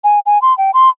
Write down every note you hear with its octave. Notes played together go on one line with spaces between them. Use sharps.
G#5
G#5
C6
G5
C6